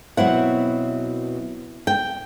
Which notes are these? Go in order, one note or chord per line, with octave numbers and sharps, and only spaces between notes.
B2 F#3 C4 E4 F#5
G5